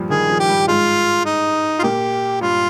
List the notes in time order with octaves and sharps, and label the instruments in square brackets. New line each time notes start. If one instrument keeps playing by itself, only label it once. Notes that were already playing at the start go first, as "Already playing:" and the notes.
Already playing: [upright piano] G2 A#2 F3 G3
[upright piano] D#3 [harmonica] G#4
[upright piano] F3
[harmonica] G4
[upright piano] G2 G3
[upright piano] G#2 G#3 [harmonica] F4
[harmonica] D#4
F4
[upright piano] A#2 A#3 [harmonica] G4
[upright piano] G2 G3 [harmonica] F4